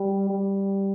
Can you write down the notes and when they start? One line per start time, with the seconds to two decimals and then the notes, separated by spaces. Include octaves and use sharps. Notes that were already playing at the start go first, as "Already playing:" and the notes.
Already playing: G3
0.30 G3